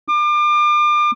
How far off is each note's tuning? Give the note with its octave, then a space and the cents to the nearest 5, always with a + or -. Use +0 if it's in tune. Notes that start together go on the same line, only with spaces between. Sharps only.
D6 +35